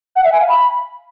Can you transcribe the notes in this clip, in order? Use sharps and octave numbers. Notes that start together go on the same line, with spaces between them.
F#5
E5
G#5
F5
B5